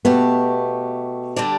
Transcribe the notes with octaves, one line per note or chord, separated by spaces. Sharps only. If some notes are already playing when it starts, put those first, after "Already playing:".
B2 A3 B3 G4
D3 G3 D4 G4 D5